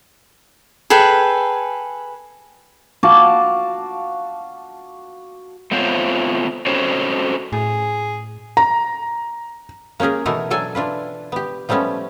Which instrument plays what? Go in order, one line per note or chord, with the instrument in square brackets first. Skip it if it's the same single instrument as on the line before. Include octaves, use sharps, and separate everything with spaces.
[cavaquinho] G#4 A4 B4 G5
[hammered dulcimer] F#4 F5 A5 D6
[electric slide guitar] A3 B3 C4 F4 C5 C#5
C4 C#4 F#4 A4 C5 C#5
[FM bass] A2 [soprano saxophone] G#4
[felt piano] A#5
[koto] A#3 C#4 G4 G#4 A#4
B2 E3 A3 D#4 F#4 A#4
F#3 D4 A4 G#5
E3 D4 F4 B4
B3 G4
F3 G3 A3 B3 C#4 A4